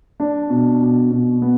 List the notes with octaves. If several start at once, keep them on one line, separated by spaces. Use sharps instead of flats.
D4
B2
B2
B2
B3